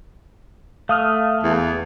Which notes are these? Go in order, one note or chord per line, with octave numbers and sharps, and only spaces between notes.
A3 F5 D#6 F6
E2